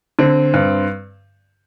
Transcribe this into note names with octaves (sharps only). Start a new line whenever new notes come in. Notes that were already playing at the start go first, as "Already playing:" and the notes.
D3 C4
G2